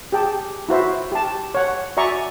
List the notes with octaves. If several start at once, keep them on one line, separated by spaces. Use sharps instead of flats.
G4 G#4 G5 A5
E4 F#4 C5 E5
G4 A5
C#5 F#5
F#4 D5 E5 G#5 A#5 C#6